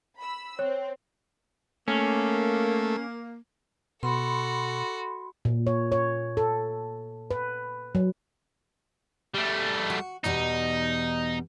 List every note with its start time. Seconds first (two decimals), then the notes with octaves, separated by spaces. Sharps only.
0.17 B5 E6
0.59 C4 C#5
1.88 A3 A#3 C#4
4.03 B2 F#4 A4 B5 C6
5.45 A#2
5.67 C#5
5.92 C#5
6.37 A4
7.31 B4
7.95 F#3
9.34 G3 A3
9.90 F#4
10.24 E2 B2 G3 D#4